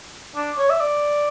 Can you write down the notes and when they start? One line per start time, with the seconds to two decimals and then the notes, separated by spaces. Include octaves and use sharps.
0.36 D4
0.58 C#5
0.70 E5
0.80 D5